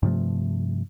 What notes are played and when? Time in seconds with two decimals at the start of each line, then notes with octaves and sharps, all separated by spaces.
0.03 G2 C3 F3 A3